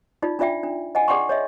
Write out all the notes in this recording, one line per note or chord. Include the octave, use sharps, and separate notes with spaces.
D#4 F4 D5
D4 F4 D5 E5 G5
D4
D#5 F#5 G#5
G#4 D5 F#5 G5 C6 C#6
C#5 D#5 E5